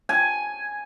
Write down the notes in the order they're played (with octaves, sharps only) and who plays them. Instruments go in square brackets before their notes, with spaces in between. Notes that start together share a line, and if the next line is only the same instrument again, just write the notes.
[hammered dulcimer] G#5